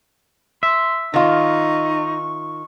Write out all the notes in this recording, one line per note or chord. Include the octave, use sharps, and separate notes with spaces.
E5 C6
D#3 D#4 F4 C#6